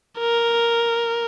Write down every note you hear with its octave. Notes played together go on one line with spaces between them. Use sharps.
A#4